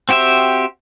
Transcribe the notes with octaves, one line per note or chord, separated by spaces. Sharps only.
C4 F#4 G4 C5 E5